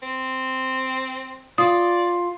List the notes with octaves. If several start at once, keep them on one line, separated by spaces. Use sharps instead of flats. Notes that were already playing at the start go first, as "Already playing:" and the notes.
C4
F4 D5 D#6